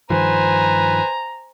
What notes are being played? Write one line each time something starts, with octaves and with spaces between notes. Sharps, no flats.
G2 D#3 F3 B4 C5 G#5 A#5